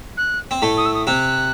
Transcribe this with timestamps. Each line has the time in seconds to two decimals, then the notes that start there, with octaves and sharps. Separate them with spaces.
0.17 F#6
0.51 C4
0.62 A2 A3
0.77 D#6
0.85 E6
0.94 D#6
1.07 C3 C4 F#6